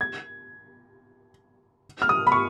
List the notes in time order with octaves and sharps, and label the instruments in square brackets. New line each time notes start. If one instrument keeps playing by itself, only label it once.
[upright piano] G#6
F6
D#6
B5
C#6